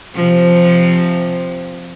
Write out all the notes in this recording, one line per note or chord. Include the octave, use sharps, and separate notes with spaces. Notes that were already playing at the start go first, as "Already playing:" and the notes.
C3 F3